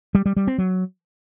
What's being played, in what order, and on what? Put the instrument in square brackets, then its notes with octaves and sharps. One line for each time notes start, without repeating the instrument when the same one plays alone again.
[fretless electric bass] G3
G3
G3
C4
F#3